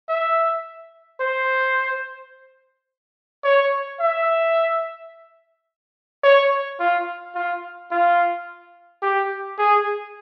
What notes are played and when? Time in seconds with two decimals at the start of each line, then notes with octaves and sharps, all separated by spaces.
0.09 E5
1.20 C5
3.44 C#5
4.00 E5
6.23 C#5
6.79 F4
7.35 F4
7.91 F4
9.02 G4
9.58 G#4